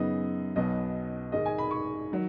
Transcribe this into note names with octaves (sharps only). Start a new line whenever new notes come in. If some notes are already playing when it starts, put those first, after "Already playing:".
Already playing: F#2 C#3 B3 D#4 D#5
B1 B2 B3 D#5
G#2 D#3 G#3 D#5
G#5
B5
C#6
D#3 F#3